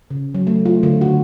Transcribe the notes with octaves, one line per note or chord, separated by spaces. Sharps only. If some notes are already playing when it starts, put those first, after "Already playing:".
C#3
F#3
A3
F4
D3
F#4